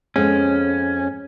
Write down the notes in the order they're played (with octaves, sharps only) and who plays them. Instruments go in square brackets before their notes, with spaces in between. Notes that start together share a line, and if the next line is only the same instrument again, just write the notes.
[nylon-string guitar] F2 G#3 B3 [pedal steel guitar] C#4